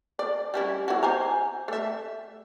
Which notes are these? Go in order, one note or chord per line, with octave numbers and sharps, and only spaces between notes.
D5
G3 C#4 E4
E4 F#4
C5 G#5 A#5
A3 E5